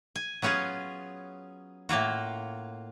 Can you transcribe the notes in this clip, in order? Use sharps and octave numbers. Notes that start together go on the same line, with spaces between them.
G#5
F#3 B3 C#4 F4 G#4
A2 A#3 F4 F#4